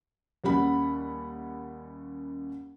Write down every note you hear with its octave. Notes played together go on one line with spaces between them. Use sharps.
D#2 G3 C#4 F#5 B5